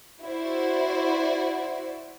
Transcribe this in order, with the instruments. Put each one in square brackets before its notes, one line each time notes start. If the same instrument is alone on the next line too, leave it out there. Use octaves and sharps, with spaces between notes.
[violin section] E4 F#4 C5 D5